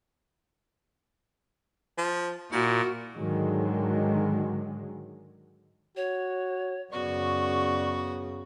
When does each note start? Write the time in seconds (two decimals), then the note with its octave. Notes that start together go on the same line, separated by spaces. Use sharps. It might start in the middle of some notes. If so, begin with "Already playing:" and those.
1.98 F3
2.52 A#2 E4 F#4
3.16 G#2 D3 D#3 F#3 G#3
5.97 F#4 C#5
6.92 F#2 C#3 B3 F#4 D5 C#6